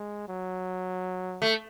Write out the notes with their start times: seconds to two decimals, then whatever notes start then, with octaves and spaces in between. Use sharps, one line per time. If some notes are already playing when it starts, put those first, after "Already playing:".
Already playing: G#3
0.28 F#3
1.42 A3